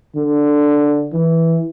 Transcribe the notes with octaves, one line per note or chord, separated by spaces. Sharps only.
D3
E3